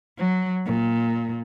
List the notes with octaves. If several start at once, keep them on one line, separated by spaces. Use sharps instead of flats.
F#3
A#2